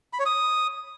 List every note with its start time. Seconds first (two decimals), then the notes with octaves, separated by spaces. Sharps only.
0.13 B5
0.19 C#5
0.26 D#6